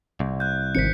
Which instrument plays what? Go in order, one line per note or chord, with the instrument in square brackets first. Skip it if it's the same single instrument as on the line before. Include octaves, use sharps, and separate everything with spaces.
[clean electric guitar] C2
[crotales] F#6 G6
[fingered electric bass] G#1 D#3 C4 [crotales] B6 C#7